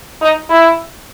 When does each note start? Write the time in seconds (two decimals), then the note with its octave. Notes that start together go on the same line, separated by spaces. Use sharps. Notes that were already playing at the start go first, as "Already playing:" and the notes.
0.21 D#4
0.50 E4